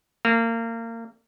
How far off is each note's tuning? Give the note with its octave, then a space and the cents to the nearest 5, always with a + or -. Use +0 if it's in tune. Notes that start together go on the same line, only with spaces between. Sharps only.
A#3 -30